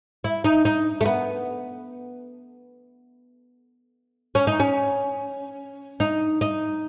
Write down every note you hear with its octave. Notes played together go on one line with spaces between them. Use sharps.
E4
D#4
D#4
A3
B3
C#4
D#4
C#4
D#4
D#4